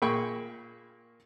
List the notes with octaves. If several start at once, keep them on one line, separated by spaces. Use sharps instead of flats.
A#2 A#3 G#4 G5 B5 C#6